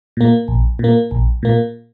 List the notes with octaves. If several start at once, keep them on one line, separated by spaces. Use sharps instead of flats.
A#2 A#3
A#1
A#2 A#3
A#1
A#2 A#3